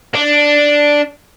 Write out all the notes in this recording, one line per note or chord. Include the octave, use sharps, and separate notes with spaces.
D4